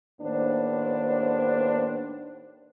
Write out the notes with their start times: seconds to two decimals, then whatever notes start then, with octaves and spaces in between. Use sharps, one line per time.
0.21 D#2 A2 B3 D4 C5